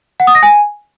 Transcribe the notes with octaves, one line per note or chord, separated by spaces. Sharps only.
F#5
D#6
A#6
G#5